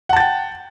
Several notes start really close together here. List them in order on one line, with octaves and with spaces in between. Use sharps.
F#5 A5 A6 G5